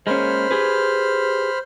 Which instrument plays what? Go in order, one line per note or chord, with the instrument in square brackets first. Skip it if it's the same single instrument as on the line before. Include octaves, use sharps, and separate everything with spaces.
[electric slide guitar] G#3 A#3 C#4 [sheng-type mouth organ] C5 B5 F6
[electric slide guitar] G4 G#4 B4